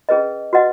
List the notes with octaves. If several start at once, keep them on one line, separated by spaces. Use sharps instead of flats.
C#4 G#4 B4 D#5
F#4 B4 D#5 F#5